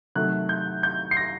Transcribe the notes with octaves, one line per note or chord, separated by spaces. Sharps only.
C3 D#3 F#3 A3 F#6
G6
G6
C7
A#6